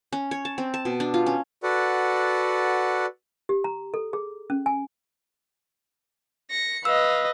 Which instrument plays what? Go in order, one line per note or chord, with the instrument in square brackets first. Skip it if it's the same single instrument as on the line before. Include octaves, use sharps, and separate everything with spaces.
[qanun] C#4
C#5
A5
C4
A5
B2
D4
F4
C#4
[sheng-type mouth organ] F#4 A4 B4 D5 F#5
[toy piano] G4
A#5
A4
G#4
C#4
G#5
[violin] A#6 C#7
[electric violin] B4 D#5 [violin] F5 [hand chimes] E6